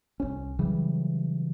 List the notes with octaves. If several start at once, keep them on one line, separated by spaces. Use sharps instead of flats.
C2 C#4
C#3 E3 F#3 G3